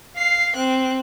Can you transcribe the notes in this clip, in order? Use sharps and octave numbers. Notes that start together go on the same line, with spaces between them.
F5 C7
C4 F#6